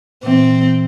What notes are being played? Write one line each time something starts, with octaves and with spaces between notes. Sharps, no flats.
A#2 E3 C4